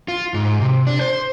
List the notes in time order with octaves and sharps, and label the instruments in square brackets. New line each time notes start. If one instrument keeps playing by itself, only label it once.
[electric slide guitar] F4
G#2
C3
D4
C5